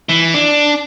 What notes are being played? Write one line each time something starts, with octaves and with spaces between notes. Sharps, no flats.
E3
D4